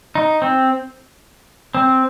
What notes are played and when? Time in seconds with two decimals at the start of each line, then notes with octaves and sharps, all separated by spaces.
0.15 D#4
0.42 C4
1.75 C4